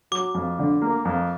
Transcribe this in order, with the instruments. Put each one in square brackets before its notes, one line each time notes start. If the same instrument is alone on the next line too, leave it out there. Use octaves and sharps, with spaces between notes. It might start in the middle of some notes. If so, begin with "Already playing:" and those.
[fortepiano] F#3 [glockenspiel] D6
[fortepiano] F2
D3
A#3
F2